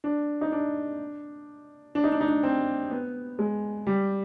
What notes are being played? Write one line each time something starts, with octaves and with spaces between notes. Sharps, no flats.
D4
D#4
D4
D4
D#4
D4
D#4
D4
C4
B3
G#3
G3